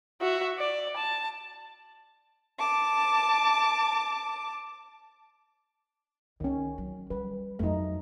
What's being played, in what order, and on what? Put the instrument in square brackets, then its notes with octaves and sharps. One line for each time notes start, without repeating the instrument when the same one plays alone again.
[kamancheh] F#4 E5
D5
A5
[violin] A5 D6
[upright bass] C#2 [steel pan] D#3 C#4
[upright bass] F#3
[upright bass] G3 [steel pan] B4
[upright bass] F2 F#3 [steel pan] A3 D#4